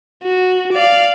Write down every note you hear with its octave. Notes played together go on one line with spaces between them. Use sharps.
F#4
D5 F5